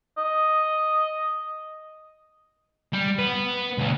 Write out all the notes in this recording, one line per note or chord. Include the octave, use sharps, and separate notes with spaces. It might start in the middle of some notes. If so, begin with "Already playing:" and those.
D#5
G3
B3 B4
C#2 A#2